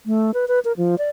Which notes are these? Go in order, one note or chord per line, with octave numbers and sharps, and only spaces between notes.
A3
B4
B4
A#4
F3
D5